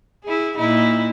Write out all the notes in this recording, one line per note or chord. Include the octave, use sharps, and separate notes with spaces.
E4 G#4
A#2 D#4 E4